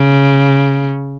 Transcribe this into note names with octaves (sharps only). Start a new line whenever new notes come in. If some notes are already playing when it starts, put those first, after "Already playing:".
Already playing: C#3